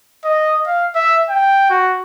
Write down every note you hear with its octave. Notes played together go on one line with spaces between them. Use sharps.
D#5
F5
E5
G5
F#4